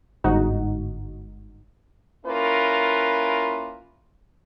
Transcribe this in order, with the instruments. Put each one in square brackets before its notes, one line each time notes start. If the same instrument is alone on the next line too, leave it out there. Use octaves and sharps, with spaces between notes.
[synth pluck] G1 G#2 D#4 F#4
[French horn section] A#3 C#4 E4 F4 A#4 B4